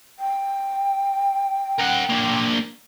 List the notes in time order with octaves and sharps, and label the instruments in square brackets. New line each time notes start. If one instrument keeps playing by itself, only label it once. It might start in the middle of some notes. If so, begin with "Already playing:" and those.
[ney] G5
[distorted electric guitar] A#4 F#5
A#3 D4